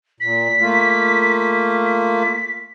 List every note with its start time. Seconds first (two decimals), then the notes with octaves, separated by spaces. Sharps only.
0.20 A#2 B6
0.59 A3 A#3 F4
1.85 B6